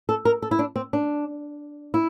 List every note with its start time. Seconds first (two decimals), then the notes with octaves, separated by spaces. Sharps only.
0.09 A4
0.25 A#4
0.42 A4
0.51 E4
0.59 D4
0.76 C4
0.93 D4
1.94 E4